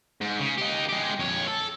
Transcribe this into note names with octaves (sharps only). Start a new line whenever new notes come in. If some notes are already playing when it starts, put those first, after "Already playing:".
G#2
C#3
D#4 G4
G#3 G4
F2 C#5
A4